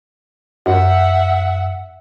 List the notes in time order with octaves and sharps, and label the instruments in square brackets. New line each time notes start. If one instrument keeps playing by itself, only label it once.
[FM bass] F#2 [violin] E5 F#5